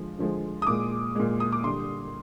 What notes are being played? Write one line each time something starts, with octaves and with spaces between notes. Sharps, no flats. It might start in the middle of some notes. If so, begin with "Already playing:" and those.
Already playing: D3 F3 G#3
D3 F3 G#3
D#6
A#2 G#3 D6
A#2 G#3
D#6
D6
D3 G3 C6